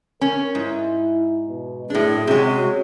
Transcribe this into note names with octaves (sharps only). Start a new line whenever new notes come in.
C#4 A#4
G#2 E4
B2
F#2 A2 D4 G#4
C3 G#3 C#4 F#4